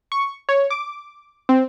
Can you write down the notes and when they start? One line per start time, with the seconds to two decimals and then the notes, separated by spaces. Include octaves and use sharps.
0.12 C#6
0.49 C#5
0.70 D6
1.49 C4